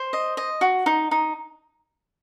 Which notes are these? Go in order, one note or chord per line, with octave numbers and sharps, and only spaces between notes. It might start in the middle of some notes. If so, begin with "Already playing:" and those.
Already playing: C5
D#5
D#5
F#4
D#4
D#4